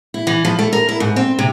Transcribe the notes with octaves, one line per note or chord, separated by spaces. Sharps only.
E4
E3
F3
A3
A#4
E4
G#2
C4
C3